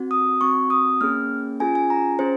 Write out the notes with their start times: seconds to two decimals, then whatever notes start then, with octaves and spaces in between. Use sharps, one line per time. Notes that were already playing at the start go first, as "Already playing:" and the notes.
Already playing: C4 F#4
0.11 D#6
0.41 C4 F#4 C#6
0.70 D#6
1.01 A#3 C#4 G#4 F6
1.60 C#4 F4 G#4 G#5
1.75 G#5
1.90 A#5
2.19 C#4 G#4 C5